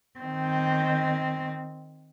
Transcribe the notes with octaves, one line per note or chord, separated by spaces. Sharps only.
D#3 C4